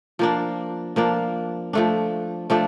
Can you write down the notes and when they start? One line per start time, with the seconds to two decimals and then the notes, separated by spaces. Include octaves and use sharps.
0.19 F3 A#3 D4
0.96 F3 A#3 D4
1.73 F3 A3 D4
2.50 F3 A3 D4